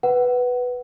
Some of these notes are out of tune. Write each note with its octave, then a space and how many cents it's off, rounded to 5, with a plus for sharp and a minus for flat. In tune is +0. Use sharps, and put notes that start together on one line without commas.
B4 +0 F#5 +15